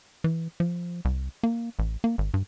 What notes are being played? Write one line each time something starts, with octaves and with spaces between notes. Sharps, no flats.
E3
F3
C2
A#3
A1
A#3
G#1
G2